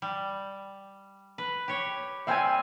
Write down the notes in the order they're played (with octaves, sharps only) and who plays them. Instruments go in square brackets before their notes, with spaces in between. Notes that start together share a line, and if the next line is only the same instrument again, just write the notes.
[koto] G3
B4
G4 C#5
[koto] G3 C4 [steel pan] E5 G5 G#5